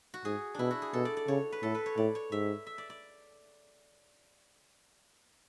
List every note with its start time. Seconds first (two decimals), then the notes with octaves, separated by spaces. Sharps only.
0.14 F#4
0.25 G#2 G#4
0.55 B2 D4 E4
0.71 F#4
0.82 G#4
0.93 B2 A4
1.05 D5
1.17 D5
1.28 C#3 C#5
1.52 B4
1.63 A2 A4
1.75 B4
1.86 C#5
1.97 A2 D5
2.15 C#5
2.32 G#2 E5
2.66 E5
2.78 D5
2.90 D5